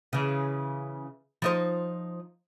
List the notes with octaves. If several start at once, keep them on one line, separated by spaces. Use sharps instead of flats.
C#3 E3
F3 D#4 C5